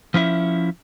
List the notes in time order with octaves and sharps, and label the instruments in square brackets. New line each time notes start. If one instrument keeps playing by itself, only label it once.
[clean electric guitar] F3 C#4 E4 E5